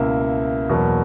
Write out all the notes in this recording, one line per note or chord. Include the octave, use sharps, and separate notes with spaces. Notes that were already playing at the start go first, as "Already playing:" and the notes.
Already playing: C#2 B2 A#3 E4 E5
E2 B2 F#3 A#3